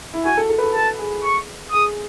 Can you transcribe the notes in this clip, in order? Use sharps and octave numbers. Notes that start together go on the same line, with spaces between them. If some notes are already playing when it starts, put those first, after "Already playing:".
E4
F#4 G#5
A4
A4
B4
A4
A4 A5
G#4
C#6
G#4 D#6